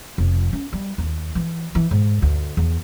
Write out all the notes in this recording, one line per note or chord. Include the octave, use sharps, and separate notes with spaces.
F1
C#4
G3
D#2
E3
E3
G#2
D2
E2